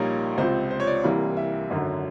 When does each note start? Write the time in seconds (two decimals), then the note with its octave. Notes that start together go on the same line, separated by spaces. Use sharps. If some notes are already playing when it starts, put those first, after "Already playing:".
Already playing: A#1 A#2 G3 A#3 D#4 C#5
0.38 C#2 C3 F3 C5
0.71 C5
0.80 C#5
0.87 D5
1.04 C2 C3 E3 G3 A#3
1.37 E5
1.70 G#1 F#2 D3 F#3